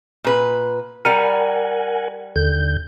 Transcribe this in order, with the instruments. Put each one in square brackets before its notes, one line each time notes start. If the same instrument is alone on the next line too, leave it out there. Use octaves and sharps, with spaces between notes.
[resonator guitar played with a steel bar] A#2 B4
[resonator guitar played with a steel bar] G3 A#5 [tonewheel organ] A#4 F#5 G#5
[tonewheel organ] D#2 D3 G6